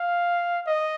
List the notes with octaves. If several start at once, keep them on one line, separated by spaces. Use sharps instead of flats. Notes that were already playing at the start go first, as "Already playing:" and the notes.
Already playing: F5
D#5